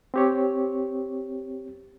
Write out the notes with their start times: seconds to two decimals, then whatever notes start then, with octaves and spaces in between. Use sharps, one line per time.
0.14 C4 G4 C#5